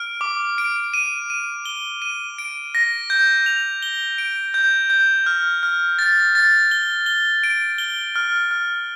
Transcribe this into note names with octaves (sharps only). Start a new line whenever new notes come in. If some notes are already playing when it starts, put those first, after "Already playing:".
Already playing: F6 D7
D6
D7
D#7
D#7
G7
D#7
D7
A#6
G6
F7
G7
D7
G6
G6
F6
F6
A6
A6
G7
G7
D7
G7
F6
F6